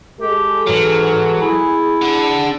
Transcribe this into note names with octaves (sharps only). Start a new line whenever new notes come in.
G#3 G4 A4
G#2 E3 F#3 F6
E4 G#4
D4 F#5